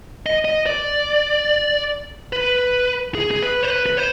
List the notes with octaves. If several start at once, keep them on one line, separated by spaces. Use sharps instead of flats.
D#5
D#5
D5
B4
G#4
G#4
B4
C5
B4
B4
C5